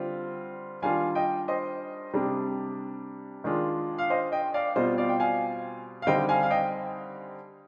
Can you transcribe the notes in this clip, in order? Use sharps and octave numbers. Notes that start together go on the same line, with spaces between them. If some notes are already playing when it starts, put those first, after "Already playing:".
Already playing: D3 G3 C4 F4
D#3 G3 D4 F4 F5 G#5
D#5 G5
C5 D#5
C3 G3 D4
D#3 G#3 D4 F4
F5
C5 D#5
D#5 G5
D5 F5
B2 G3 C4 F4 C5 D#5
D5 F5
G5
F5 G#5
F5
D3 G3 C4 D#4 D#5 G5
F5 G#5
F5
D#5 G5